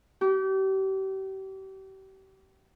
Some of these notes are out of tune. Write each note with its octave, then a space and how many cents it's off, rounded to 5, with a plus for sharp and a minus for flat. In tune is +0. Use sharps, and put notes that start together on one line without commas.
G4 -35